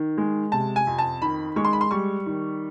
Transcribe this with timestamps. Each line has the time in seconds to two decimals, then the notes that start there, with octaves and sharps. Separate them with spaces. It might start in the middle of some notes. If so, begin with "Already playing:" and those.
Already playing: D#3
0.18 G#3
0.52 C3 A5
0.76 G#5
0.87 F2
0.98 A5
1.22 D#3 B5
1.56 G#3 C#6
1.65 C6
1.73 B5
1.81 C6
1.91 G3 C#6
2.26 D#3